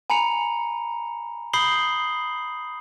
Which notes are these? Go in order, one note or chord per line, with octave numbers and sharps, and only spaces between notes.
G#5 A#5 B5 C#7 F7
B5 D#6 G6 C7 F#7 G7